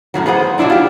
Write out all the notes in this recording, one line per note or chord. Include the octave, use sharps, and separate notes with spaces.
F#2 A2 C#3 F#3
B3 G#4 C5 D5 F#5
B2 F#3 D4 E4 D5
F4 G4